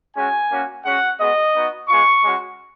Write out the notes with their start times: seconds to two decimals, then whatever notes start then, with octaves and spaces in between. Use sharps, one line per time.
0.15 G#3 C#4 F#4 G#5
0.50 A#3 C#4 F#4
0.84 G#3 C#4 F#4 F#5
1.19 G#3 B3 F#4 D#5
1.54 B3 D#4 F#4
1.88 G#3 B3 F4 C#6
2.23 G#3 C#4 F#4